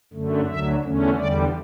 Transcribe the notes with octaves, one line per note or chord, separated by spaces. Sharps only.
F#2 D3 A3
D2 D3 F#3 E5
E2 D3 A3 C#4
E2 D3 G3 D5